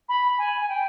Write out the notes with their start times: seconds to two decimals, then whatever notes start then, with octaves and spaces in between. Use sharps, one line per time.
0.09 B5
0.38 G#5
0.61 G#5
0.68 G5